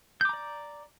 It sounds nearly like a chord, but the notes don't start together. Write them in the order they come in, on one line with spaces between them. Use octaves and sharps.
G6 D6 A#5 D5